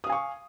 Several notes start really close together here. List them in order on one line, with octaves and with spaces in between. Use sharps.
D#6 F5 G#5 C#6